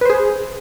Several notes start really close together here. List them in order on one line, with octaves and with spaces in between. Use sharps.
B4 C5 G#4